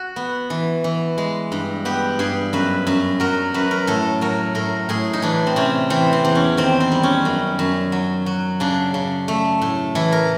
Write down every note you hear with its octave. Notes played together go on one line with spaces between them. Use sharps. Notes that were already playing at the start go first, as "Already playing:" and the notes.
Already playing: F#4
B3
E3
E3
G#3
G2
B3 G4
G2 G#4
F#2 B4
F#2
F#3 A#4
F#2 B4
A#4
A2 A4
F#3 A#4
A2 A#4
A2 G#4
D#4
E3 D4
C4
C3 C#4
E3 C4
C4
E2
C#4
D#3 C4
C4
G3
C#4
F#2
F#2
F#3
F#3
C#3 D4
C#3
A3
A2
E3 E4
A#4